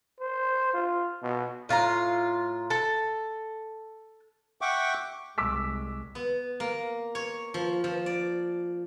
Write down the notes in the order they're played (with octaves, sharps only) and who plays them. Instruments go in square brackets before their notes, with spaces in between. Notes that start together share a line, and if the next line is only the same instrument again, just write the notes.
[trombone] C5
F4
B2
[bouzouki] A2 F4 F#4 A#5
A4
[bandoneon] E5 F#5 G5 C#6 D6
[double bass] C2 G#3 [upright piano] D6 E6 B6
[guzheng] B3
A#3
C#5
F3
F3
D5